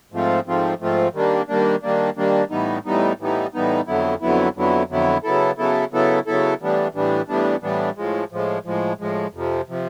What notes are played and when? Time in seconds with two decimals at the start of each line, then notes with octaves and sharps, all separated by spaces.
0.12 G#2 F3 A3 C4 F4
0.46 G#2 F3 A3 C4 F4
0.81 G#2 F3 A3 C4 F4
1.14 D#3 G3 A#3 D4
1.48 D#3 G3 A#3 D4
1.83 D#3 G3 A#3 D4
2.17 D#3 G3 A#3 D4
2.51 A2 E3 G3 B3 D#4
2.86 A2 E3 G3 B3 D#4
3.19 A2 E3 G3 B3 D#4
3.54 A2 E3 G3 B3 D#4
3.87 F2 D3 F#3 B3 E4
4.22 F2 D3 F#3 B3 E4
4.56 F2 D3 F#3 B3 E4
4.90 F2 D3 F#3 B3 E4
5.24 C#3 F#3 B3 E4 A4
5.58 C#3 F#3 B3 E4 A4
5.92 C#3 F#3 B3 E4 A4
6.27 C#3 F#3 B3 E4 A4
6.60 A2 E3 G3 B3 D4
6.94 A2 E3 G3 B3 D4
7.28 A2 E3 G3 B3 D4
7.62 A2 E3 G3 B3 D4
7.97 A2 F3 G#3
8.31 A2 F3 G#3
8.65 A2 F3 G#3
9.00 A2 F3 G#3
9.33 F2 C3 F3
9.68 C3 F3